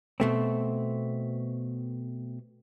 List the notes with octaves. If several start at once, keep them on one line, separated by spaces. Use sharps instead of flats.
B2 A3 C4